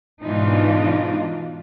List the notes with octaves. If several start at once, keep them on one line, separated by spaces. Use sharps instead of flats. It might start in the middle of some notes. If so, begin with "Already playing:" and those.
G#2 B2 E3 D4 D#4 F4